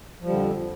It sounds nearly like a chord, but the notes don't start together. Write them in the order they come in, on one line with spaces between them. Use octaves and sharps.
F3 G3 D3 F2